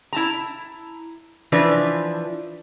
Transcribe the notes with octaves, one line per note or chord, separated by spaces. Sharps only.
E4 A5 A#5
E3 F3 D4 B4